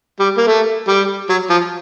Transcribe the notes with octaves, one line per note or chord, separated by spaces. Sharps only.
G3
A#3
A3
G3
F#3
F3